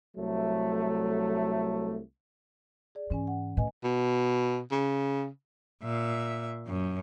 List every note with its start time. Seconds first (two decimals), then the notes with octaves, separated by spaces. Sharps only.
0.17 C2 F#3 A3
2.95 G#4 D5
3.10 G#2 E3 C#4 G#5
3.27 F#5
3.57 A2 B4 D#5 G#5
3.84 B2
4.72 C#3
5.83 A#2 E5
6.67 F#2